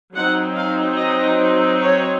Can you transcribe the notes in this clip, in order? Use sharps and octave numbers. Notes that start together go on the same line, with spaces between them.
F#3 C4 D#4 F#5
F5
D#5
C#5